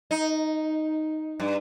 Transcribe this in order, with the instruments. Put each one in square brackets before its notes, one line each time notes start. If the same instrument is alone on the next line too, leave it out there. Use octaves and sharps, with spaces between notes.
[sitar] D#4
G2